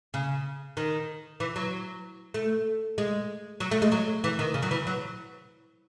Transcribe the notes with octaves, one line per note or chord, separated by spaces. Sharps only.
C#3
D#3
E3
F#3
A3
G#3
F#3
A3
G#3
F#3
E3
D#3
C#3
F#3
E3
F#3